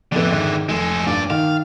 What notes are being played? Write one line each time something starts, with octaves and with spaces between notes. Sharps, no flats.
F2 A2 D3 E3 B3
G#2 D#3
F1 G#3 A4 E7
G2 A#2 D5
D#3 F5